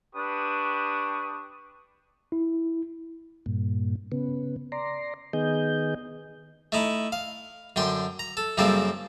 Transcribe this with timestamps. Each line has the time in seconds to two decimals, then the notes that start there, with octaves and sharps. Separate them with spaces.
0.15 D4 G4 B4 C#6 D#6
2.32 E4
3.46 G2 A#2
4.12 C#3 B3
4.72 D5 A#5 C6
5.33 D#3 B3 G#4 D#5 G6
6.72 A3 D#4 E4
7.12 F5
7.76 F#2 D3 G5 C6
8.19 A#5
8.37 A4
8.58 F#2 C#3 G3 A#3 C4 A4